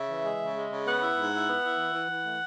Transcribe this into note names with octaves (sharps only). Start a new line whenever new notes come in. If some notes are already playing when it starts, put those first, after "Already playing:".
Already playing: C#3 E5
E3
G#3
C#3
G#3
C#3
B3 F#5
E4
G#2
E4
B3
E4
E3
E3
E3
A3